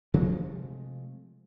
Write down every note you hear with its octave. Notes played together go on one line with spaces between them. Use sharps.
C3 F3 G#3 A3